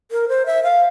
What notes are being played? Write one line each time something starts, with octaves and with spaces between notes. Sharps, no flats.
A#4
C5
E5
F5